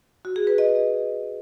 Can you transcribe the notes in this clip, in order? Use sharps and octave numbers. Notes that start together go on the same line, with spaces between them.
F#4
G#4
B4
D#5